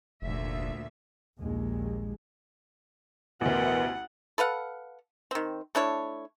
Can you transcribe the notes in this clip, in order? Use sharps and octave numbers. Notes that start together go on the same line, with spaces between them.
F1 D2 A#2 E5
A#1 D#2 A#2 G#3
A1 D2 B2 E3 A#4 B4 F#5
A4 B4 F5 F#5
D#3 C4
A3 D4 E4 C#5